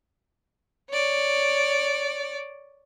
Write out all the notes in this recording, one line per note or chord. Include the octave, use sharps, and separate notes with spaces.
C#5 D5